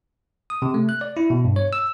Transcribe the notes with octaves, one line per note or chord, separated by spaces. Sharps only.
D#6
C3
A3
F#6
D5
E4
B2
G2
C#5
E6